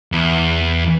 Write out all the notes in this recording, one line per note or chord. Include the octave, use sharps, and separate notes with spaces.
E2